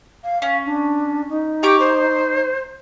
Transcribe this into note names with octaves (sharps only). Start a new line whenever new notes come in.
F5
C#4 F5
D4
D#4
G4 A#5 C#6 D6
C5